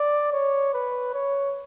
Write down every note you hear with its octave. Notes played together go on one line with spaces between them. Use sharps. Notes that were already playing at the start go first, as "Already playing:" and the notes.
Already playing: D5
C#5
B4
C#5